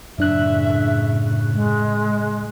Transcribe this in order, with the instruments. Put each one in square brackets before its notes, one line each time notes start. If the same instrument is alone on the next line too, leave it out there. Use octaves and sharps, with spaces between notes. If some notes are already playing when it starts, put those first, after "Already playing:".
[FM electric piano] F#2 D4 F#6 [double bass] A2 C#3 [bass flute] E5
[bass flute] G#3